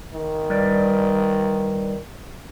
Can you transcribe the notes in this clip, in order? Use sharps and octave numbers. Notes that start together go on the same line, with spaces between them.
D#3
G3 B4 D5